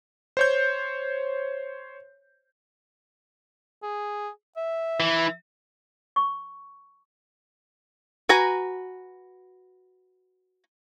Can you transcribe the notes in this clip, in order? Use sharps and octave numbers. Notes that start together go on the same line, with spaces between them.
C5 C#5 G6
G#4
E5
E3
C#6
F#4 B4 G#5 A#5